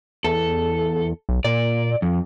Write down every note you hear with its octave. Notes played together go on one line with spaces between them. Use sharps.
E2 A4
B1
A#2 D5
F2